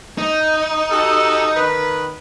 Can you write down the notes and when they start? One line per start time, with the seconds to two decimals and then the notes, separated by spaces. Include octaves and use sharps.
0.18 D#4
0.91 F#4 G4 A4
1.56 D#3 B4